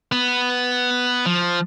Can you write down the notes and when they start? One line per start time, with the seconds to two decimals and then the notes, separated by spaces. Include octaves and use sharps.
0.12 B3
1.26 F3